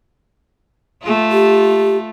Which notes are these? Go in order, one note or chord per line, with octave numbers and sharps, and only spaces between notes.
A3 F4
G4